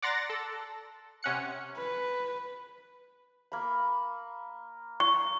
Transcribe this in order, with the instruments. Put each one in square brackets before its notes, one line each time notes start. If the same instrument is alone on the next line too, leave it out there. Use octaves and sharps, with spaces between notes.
[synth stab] D5 F#5 A#5 C6 A6 A#6
A4
C3 C#4 F#5 C#7
[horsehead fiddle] B4
[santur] A#3 B5
[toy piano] C#6